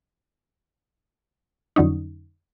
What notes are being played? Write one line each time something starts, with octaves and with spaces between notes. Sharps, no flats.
F2 D3 F#3 C#4 D#4